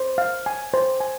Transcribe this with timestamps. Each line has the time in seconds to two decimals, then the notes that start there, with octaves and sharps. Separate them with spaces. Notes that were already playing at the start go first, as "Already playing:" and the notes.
Already playing: C5
0.18 F5
0.46 G#5
0.74 C5
1.00 G#5